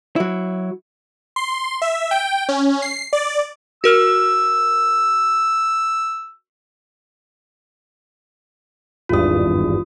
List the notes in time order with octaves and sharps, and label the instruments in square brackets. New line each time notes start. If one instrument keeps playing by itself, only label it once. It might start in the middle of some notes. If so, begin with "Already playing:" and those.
[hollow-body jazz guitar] F#3 E4
[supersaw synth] C6
E5
G5
C#4
C7
D5
[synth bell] F#4 A#4 F6 [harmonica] E6
[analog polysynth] G#1 E2 G2 [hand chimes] F4 D#6